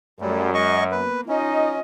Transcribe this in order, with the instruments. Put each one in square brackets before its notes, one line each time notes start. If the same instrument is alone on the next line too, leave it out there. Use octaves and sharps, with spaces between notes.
[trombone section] F#2 [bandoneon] F#3 G3 [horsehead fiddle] A3
[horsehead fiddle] G#3 [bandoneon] D#5 C#6
[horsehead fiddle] A#3 B3 [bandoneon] B4
[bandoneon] C#4 [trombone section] D#4 [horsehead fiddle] F4 D#5